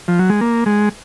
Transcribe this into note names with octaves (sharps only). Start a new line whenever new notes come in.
F3
F#3
G#3
A#3
G#3